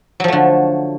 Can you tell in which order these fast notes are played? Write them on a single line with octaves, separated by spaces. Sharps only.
F#3 F3 A3 D3